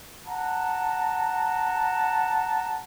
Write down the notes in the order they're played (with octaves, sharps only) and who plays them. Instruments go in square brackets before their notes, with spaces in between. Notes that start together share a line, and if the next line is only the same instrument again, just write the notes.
[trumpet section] F#5 A5 A#5